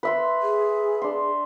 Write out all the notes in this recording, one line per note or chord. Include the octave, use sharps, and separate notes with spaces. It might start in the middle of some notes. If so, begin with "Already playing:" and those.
B4 E5 C6
G#4
D4 C6